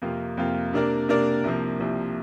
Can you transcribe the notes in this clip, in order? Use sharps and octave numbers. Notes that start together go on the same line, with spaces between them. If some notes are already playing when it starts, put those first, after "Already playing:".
F2 C3 A#3 F4
F2 C3 A#3 F4
C3 A#3 D4 A#4 D5
C3 A#3 D4 A#4 D5
C2 C3 F3 A#3
C2 C3 F3 A#3